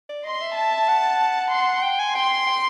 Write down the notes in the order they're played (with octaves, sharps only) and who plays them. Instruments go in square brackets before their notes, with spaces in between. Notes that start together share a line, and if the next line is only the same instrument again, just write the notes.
[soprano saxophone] D5
[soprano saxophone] D#5 [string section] C6
[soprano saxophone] E5
[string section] A5
[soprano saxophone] F#5
[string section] C6
[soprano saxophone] G5
G#5
[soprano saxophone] G5 [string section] C6
[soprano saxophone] G5